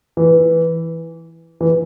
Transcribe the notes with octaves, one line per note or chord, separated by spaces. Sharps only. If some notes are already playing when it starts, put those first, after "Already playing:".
E3
E3